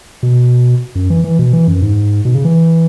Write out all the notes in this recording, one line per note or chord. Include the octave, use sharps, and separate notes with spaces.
B2
F#2
E3
E3
B2
E3
F#2
G#2
B2
C#3
E3